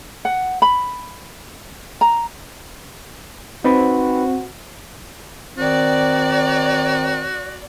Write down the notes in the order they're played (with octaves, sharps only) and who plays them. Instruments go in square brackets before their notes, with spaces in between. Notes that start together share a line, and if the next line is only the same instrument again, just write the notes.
[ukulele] F#5
B5
A#5
[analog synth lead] C4 [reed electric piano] D#4 B4 B5 [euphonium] F#4
[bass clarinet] D#3 [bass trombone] C4 [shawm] F#4 [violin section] D5